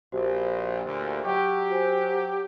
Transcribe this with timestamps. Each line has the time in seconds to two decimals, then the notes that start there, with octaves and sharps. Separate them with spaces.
0.12 A#1 F#4 G4 C5
0.85 D2 A#2
1.23 F#3 G4 D#5 C#6
1.69 F#4 C5 G#5